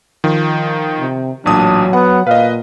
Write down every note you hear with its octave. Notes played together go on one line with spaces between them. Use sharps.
D#3 F3
C3
A1 A#2 F#3 D4 D#6
B3 F#5
A#2 B4 D#5 F5